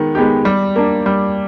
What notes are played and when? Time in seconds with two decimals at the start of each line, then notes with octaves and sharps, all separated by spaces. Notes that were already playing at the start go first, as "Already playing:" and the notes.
Already playing: D#3 G#3 B3
0.15 G#3 B3 D#4 G4
0.45 G3
0.76 A#3 D4
1.06 G3